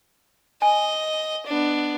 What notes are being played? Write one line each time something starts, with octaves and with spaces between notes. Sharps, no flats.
D#5 G#5
B3 D4